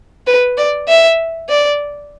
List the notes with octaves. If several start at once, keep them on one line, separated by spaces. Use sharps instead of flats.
B4
D5
E5
D5